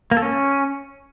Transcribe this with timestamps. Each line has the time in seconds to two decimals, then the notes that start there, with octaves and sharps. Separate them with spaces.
0.11 A#3
0.17 A4
0.22 C#4